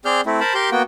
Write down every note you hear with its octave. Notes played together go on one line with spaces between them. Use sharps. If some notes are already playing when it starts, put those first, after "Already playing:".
C4 G#4 D5 F6 G6
A3 C4 E4
A#4 C5 A5 B5
G4 A#4 C6 G6
A#3 B3 F#4 G5